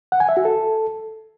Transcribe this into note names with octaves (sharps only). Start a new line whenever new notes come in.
F#5
G#5
E5
F#4
A4